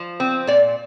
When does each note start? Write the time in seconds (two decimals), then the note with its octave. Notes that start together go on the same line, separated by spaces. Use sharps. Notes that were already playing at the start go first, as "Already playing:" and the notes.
Already playing: F3
0.20 C4
0.47 A#2 D5